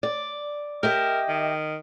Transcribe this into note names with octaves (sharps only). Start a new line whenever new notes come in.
D5
G4 A#4 D#5 E5
D#3